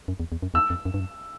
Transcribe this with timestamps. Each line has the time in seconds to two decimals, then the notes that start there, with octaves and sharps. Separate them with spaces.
0.08 F#2
0.20 E2
0.32 E2
0.43 F#2
0.54 E2 E6
0.70 F2
0.85 F#2
0.94 G2
1.00 F#2